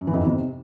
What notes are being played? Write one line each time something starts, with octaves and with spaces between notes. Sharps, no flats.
F#2
E3
F2
D#3
C3